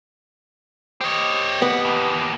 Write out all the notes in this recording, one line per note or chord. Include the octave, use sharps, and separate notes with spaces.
G4 C5 C#5 D#5
B3 F#5
D#2 E3